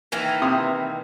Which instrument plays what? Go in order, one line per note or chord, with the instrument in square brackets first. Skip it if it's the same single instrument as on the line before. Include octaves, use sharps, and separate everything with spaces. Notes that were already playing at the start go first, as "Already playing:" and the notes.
[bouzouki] D#3 E3 A#3
[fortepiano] C3 D#6